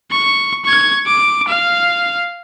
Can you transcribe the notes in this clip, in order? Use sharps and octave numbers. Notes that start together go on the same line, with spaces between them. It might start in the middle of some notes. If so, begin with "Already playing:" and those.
C#6
C#6 G#6
D6
F5